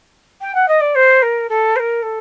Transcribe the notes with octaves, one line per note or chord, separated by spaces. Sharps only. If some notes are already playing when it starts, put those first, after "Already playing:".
G5
F#5
D#5
D5
C5
A#4
A4
C5
A#4
A4